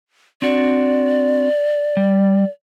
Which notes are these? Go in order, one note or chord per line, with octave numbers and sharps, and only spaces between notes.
C4 D4 F#4 D5
G3